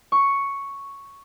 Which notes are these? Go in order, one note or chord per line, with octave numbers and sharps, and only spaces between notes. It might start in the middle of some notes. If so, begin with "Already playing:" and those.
C#6